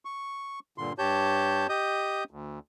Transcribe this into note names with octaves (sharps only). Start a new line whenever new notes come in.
C#6
G2 A#2 D3 C6
G2 G4 C#5 A5 G6
G4 D#5 D#6 G6
D2